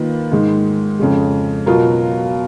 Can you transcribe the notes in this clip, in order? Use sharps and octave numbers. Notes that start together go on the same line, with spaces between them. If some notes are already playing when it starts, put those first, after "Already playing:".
Already playing: D#3 A#3 F4 B4
G#2 D#3 G#3
F2 C#3 G#3
B2 F#3 B3 F4 A#4